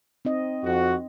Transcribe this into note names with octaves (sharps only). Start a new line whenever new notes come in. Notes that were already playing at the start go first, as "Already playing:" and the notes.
C4 D#4 D#5
F2 F#4